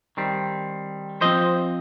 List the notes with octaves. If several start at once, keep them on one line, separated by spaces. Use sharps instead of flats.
D#3 G3 C4
F3 C4 C5 D#5